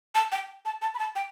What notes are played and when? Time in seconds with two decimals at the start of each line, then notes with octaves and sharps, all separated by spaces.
0.15 A5
0.32 G5
0.65 A5
0.82 A5
0.94 B5
0.99 A5
1.16 G5